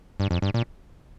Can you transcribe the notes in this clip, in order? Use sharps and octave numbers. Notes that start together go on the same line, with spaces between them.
G2
F2
G2
A#2